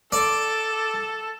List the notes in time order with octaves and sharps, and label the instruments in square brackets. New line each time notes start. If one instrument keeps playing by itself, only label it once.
[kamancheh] A4 [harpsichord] D5